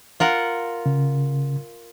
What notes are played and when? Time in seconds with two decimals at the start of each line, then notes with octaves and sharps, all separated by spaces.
0.20 F4 A#4 F#5
0.86 C#3